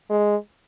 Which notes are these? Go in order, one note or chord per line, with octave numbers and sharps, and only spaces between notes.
G#3